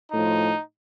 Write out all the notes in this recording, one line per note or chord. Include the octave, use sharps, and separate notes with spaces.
A2 F3 D#4